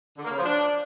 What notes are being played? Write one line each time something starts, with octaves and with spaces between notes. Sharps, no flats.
D3
A#3
C#3
F3
D4